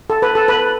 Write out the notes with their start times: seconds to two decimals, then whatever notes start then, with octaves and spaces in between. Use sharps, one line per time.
0.10 A4
0.22 B4
0.35 A4
0.48 B4